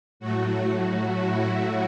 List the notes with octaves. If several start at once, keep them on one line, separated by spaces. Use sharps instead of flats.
A2 F#3 A3 F#4
E4